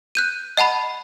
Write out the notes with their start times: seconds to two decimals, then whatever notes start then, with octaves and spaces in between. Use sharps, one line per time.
0.15 F#6 G6 D#7
0.57 D#5 F#5 A5 B5